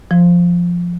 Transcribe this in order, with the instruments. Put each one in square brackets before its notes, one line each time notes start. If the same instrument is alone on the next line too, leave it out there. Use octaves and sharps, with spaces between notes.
[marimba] F3